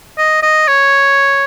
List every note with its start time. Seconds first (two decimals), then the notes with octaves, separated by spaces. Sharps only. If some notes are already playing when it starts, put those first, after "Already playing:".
0.18 D#5
0.42 D#5
0.68 C#5